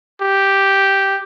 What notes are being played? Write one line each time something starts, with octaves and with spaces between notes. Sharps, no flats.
G4